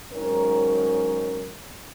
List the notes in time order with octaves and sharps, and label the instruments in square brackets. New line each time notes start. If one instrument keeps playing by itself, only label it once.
[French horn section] G#2 D#3 F#3 C#4 A#4